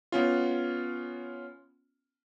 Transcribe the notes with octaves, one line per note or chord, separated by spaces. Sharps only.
B3 C#4 F4